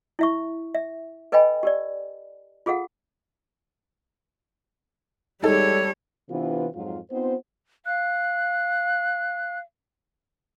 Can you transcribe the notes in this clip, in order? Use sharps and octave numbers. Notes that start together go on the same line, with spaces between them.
E4 E5 C#6
E5
A4 B4 D#5 G5 G#5 B5
G4 A#4 D5
F4 G#4 A4 F5 F#5
G3 G#3 D#4 A4 C#5
C3 E3 B3 C4 D4 F4
F2 G#2 F#3 F4
B3 C4 D#4 F4 C5
F5 F#6